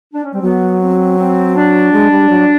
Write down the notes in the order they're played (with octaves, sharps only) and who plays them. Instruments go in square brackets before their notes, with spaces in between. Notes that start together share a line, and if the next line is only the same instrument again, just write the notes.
[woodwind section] D4
C#4
[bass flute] G3 [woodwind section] C4
[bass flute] F#3 [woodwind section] B3
[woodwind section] C4
C4
D4
[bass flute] G#3
G3
F#3